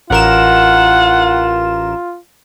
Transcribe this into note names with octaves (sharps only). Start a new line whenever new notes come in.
A1 F4 A#4 F#5 E7